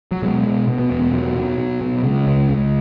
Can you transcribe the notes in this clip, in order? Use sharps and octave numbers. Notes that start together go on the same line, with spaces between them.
F#3
B2 G#3
B2
B2
B3
E2 B3
B3
B2 F#3
B2
B2
B2
C#3 G#3
C#2
C#2